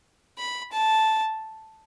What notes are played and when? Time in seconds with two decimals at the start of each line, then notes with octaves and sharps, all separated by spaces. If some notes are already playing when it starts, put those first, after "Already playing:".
0.38 B5
0.72 A5